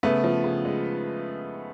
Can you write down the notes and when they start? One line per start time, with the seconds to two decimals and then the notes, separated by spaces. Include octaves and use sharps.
0.03 C#3 A3 B3
0.24 F3
0.44 C#3
0.65 G#3